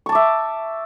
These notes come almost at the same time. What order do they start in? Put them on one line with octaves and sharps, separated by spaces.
C#6 A5 D6 E5